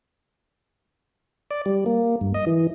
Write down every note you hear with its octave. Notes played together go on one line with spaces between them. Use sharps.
D5
G3
A#3
G2
D#5
E3